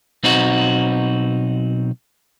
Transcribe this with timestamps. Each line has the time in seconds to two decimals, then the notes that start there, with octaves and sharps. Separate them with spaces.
0.23 B1 C4 D#4 F#4